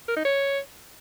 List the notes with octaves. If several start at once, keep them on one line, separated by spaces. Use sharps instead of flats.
A#4
D#4
C#5